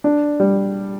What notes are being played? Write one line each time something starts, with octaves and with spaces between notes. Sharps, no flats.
D4
G3